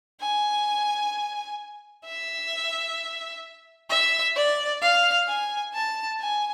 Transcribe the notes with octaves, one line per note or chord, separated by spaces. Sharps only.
G#5
E5
E5
D5
F5
G#5
A5
G#5